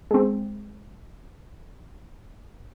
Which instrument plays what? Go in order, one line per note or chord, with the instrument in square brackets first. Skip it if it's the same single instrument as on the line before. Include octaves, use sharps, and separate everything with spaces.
[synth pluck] G#3 C4